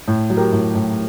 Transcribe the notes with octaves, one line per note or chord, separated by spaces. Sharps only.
A2
F#3
G4 A#4
A2
A2